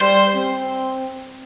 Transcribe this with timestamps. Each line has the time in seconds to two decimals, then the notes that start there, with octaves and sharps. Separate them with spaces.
0.01 G3 C5
0.35 C4